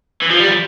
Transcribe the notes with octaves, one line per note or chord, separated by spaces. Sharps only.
E3
F3
G3
F3